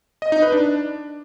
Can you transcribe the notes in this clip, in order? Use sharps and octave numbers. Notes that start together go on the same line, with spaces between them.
D#5
D#4
B4
D4